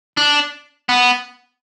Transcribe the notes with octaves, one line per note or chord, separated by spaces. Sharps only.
D4
B3